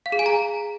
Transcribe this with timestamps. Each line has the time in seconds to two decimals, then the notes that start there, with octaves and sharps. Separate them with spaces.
0.06 F5
0.12 G#4
0.19 G#5
0.26 A#5